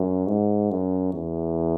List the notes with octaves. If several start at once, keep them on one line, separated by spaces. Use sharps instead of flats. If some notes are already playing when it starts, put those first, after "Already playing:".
Already playing: F#2
G#2
F#2
E2